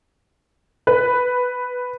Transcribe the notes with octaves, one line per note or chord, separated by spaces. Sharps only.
B4